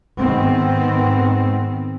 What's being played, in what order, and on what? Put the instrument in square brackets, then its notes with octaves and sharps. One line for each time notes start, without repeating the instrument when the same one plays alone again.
[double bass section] G#2 D#3 B3 C4